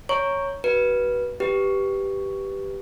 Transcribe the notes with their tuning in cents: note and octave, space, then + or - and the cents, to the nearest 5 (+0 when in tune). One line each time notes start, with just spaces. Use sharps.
C#5 +0 A#5 +0 C#6 +0
F#4 +35 B4 -20
G4 +0 B4 +0